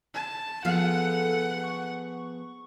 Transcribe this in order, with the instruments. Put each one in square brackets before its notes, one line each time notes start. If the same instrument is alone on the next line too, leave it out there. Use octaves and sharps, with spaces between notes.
[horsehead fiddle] A5
[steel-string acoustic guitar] F3 B3 G#4 [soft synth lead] A4 [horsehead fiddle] F#5
[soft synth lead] C#6